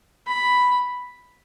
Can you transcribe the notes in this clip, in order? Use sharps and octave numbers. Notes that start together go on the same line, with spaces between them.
B5